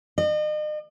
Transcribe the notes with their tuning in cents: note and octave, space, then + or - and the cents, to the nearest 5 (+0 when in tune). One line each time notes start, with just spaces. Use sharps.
D#5 -40